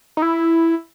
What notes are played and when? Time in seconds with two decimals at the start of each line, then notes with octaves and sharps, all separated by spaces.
0.17 D#4
0.22 E4